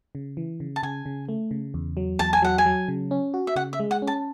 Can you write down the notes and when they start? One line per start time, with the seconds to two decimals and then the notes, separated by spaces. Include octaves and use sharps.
0.15 C#3
0.37 E3
0.60 C#3
0.76 A5
0.83 C#3 G#5
1.06 C#3
1.29 A3
1.51 C#3
1.74 E2
1.97 F#3
2.19 E2 A5
2.33 G#5
2.42 F#3 F#5
2.58 G#5
2.66 F#3
2.88 C#3
3.11 C#4
3.34 F#4
3.47 E5
3.56 C#3 F#5
3.73 E5
3.80 G#3
3.91 F#5
4.02 C#4
4.07 A5